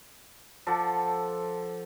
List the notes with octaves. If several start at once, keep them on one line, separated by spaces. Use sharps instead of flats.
F3 A4 F#5 D6